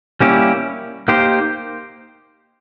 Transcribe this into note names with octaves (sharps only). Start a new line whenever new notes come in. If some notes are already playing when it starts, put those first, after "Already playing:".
G3 A#3 C#4 E4 G4
A#3 D#4 G4 C5